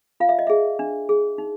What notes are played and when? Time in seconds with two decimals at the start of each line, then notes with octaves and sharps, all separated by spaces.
0.20 F4 F5
0.29 E5
0.39 D#5
0.47 G#4 E5
0.79 D4
1.09 G#4
1.38 D#4